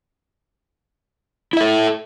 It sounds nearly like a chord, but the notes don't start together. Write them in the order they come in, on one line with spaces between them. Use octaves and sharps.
E4 E5 A4